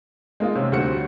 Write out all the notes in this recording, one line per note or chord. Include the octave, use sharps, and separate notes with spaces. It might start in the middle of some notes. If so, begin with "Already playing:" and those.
G#3 A#3 D#4 F4
C3 C#4
D2 G3 F#4 C5 C#7